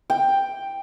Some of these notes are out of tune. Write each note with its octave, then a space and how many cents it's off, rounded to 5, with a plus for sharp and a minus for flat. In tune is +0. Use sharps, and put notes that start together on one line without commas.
G5 +5